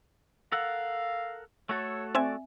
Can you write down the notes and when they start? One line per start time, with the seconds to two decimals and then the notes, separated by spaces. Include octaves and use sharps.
0.52 A4 A#4 F5 F#5
1.69 A3 F#4 A4 C#5
2.15 C4 D5 E5 G#5